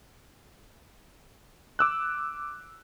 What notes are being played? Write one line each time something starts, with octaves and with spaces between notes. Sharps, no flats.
D6 E6 F#6